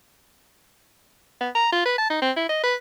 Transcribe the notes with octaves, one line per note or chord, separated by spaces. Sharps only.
B3
A#5
F4
B4
A5
D#4
C4
E4
D#5
B4